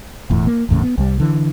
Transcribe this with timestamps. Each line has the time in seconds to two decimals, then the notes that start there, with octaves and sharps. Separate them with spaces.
0.30 E1 E2 A2
0.47 A#3
0.69 G#1 E2 A2 C#3
0.83 B3
0.98 C2 G3
1.20 D3 E3